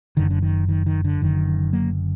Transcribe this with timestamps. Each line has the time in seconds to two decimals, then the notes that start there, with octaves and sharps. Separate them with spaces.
0.17 F#1 F#2 D3 D#3
0.30 D3
0.42 D#3
0.68 D#3
0.86 D#3
1.05 D3
1.21 F#1 F#2 D3 D#3
1.73 F#3 A#3